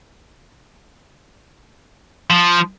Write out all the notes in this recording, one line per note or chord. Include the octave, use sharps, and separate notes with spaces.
F3